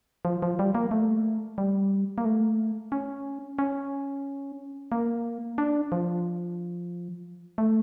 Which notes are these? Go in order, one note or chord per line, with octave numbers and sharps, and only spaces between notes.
F3
F3
G3
A#3
A3
G3
A#3
A3
C#4
C#4
A#3
D4
F3
A3